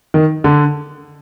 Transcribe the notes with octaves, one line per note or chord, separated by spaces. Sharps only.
D#3
D3